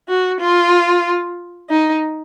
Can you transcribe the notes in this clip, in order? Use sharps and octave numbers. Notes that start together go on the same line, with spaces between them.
F#4
F4
D#4